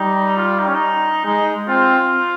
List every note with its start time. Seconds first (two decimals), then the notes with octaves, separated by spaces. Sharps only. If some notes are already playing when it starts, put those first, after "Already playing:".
Already playing: G3 D#4
0.37 F4
0.59 D#4
0.67 C#4
0.74 D#4
1.24 G#3 D#4
1.68 C4 F4